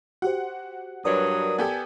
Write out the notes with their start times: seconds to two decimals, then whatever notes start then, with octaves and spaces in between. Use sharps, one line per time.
0.22 F#4 G4 C5 F#5
1.05 G2 F#3 A#4 B4 D5 D#6
1.58 B3 G4 A4 G#5